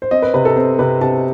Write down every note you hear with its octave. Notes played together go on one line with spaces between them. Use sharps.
C5
C4 D#5
B4
C3 B4
A4
C4
C3 B4
C3 A5